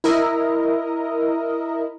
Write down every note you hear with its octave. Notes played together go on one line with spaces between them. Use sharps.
E4 A#4 D#5